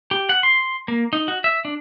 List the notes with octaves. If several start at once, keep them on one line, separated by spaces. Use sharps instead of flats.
G4
F#5
C6
A#3
D#4
F#4
E5
D4